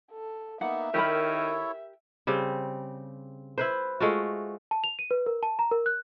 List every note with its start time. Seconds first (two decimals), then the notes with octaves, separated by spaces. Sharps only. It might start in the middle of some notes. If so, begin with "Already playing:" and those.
0.11 A4
0.61 A#3 B3 D#4 E5 F#5
0.94 D#3 E4 G4 A4 A#4 C#5 B5
2.27 C#3 G3 C4
3.58 E4 B4 C5
4.00 G#3 A3 F4 F#4
4.71 A5
4.84 F7
4.99 D#7
5.11 B4
5.26 A#4
5.43 A5
5.59 A#5
5.71 A#4
5.86 F#6